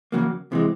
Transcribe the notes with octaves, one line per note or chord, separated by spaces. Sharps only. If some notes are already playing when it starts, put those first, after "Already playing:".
E2 C#3 F#3 A#3
C3 E3 G#3